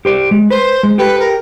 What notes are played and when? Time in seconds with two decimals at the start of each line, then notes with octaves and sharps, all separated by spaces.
0.05 G4 C5 D5
0.31 G#3
0.50 B4 C5
0.83 G#3
0.98 G4 A4 B4 G5
1.19 A#4